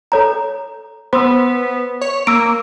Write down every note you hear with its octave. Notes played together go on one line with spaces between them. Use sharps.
A4 C#5 A#5
B3 C5 C6 E6
C#5
A#3 E6 D7